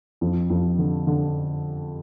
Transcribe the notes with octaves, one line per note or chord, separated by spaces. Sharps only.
F2
F2
D3
D3